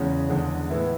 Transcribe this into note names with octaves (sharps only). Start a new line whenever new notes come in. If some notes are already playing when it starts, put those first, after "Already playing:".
Already playing: E2 C#3 G#3 C#4
E2 D3 G#3
A2 E3 B3 E4